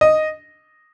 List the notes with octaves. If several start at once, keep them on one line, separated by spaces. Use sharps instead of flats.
D#5